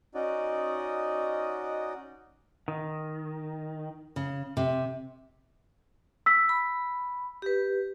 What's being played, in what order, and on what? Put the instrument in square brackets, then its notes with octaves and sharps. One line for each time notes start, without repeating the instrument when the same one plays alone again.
[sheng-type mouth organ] C#4 D#4 F#4 D5 D#5
[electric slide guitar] D#3
[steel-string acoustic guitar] C#3
C3
[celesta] E6 B6
[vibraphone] B5
G4 B4